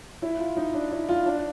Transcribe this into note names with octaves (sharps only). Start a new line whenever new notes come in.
E4
F4
D#4
D4
E4
F4
D4